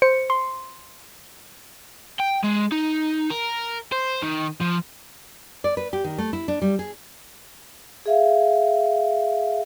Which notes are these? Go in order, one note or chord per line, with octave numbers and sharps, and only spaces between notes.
C5 C#7
C6
G5
G#3
D#4
A#4
C5
D#3
F3
D5
B4
G4
D#3
A3
E4
D4
G3
G#4
G#4 E5 F5